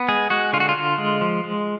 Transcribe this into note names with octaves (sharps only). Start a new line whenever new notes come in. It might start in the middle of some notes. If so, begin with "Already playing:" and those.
Already playing: B3
G#3 G#4
G#3 F#4
D3 F4
F#4
F4
D3
G#3
F3
G#3